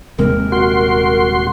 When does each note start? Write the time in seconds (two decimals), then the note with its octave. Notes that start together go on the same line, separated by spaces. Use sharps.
0.18 D#1 C3 G#3 A#4
0.52 F#4 C6